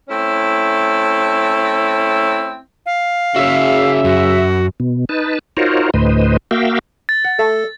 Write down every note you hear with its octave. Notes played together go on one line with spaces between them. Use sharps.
A3 C4 C#4 E4
F5
C#3 F#4 G#4 C#5 E5
F#2 F#4
B2
D#4 B4 A5
D#4 F4 F#4 A#4 C5 C#5
D2 A2 B4 C5 D#5
A#3 F#4 E5 F5 G5
A6
F#5
A3 A4